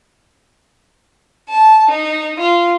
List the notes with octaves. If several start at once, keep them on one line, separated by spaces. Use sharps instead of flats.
A5
D#4
F4